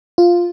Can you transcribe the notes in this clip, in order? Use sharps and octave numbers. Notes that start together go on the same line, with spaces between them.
F4